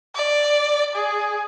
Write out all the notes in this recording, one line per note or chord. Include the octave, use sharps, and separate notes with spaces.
D5
G#4